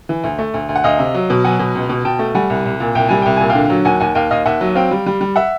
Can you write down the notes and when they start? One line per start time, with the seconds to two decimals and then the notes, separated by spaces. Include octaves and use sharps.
0.09 E3
0.24 D2
0.39 A3
0.54 D2
0.69 D2
0.76 F#5
0.84 D2 D#5 F5
0.99 C3
1.14 F#3
1.30 B2
1.45 F#3 F#5 G#5
1.59 B2
1.75 C#2
1.89 B2
2.05 B2 G5 A5
2.19 A3
2.35 G3 F#5 G#5
2.50 C2
2.66 C2
2.80 A#2
2.95 C2 G5
3.09 G3 G#5
3.22 C2 G5
3.36 A#2 G#5
3.50 F5 G5
3.55 D3
3.70 F#3
3.85 D#2 F#5 G#5
4.00 D#2 F#5 G#5
4.15 D#2 F5 G5
4.31 D#2 D#5 F5
4.46 D#2 E5 F#5
4.61 F#3
4.75 C4 F5 G5
4.91 G3
5.06 G3
5.21 G3
5.36 E5 F#5